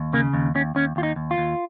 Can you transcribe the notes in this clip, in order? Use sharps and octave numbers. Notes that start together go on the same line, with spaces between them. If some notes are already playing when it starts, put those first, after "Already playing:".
Already playing: D#2
C#3 A#3
D#2
D#2 C#4
D#2 C#4
D#2 F4
D#4
D#2
F4
D#2